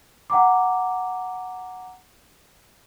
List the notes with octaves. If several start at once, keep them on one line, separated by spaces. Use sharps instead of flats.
F#5 G5 A#5 D6